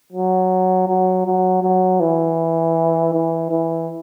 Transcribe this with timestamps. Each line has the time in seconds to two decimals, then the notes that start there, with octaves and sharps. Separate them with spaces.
0.12 F#3
0.88 F#3
1.26 F#3
1.63 F#3
2.00 E3
3.14 E3
3.51 E3